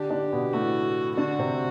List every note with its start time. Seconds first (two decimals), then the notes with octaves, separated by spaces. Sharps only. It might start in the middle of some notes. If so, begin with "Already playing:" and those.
Already playing: D3 D4 G4
0.10 D3 D4
0.32 B2 B3
0.53 A2 A3 F#4
1.17 D3 D4 F#4
1.39 C3 C4